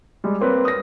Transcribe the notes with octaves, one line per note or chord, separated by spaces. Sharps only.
G3 G#3
A#3 C4 B4 C#5
D#6 A#6